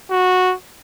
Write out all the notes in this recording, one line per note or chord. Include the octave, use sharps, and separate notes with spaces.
F#4